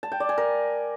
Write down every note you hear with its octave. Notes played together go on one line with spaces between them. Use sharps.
A5
G5
D5
G#5
A#4